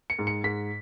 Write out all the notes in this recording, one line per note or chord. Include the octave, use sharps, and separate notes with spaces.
C#7
G#2
C#7
G#2 B6